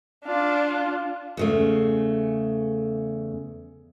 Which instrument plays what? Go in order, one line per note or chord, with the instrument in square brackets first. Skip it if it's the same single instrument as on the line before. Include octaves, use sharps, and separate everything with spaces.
[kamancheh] D4 F4
[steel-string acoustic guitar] E2 C#3 A3